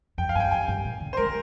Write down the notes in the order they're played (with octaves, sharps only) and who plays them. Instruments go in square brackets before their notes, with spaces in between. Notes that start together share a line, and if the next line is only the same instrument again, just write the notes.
[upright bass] F2 [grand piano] G5
[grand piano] F5
[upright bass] G2 [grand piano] G#5
[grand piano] G5
[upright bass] F2 [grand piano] G#5
[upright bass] G2
A#2
D3
[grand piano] C5
[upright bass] G#3 [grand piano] A#4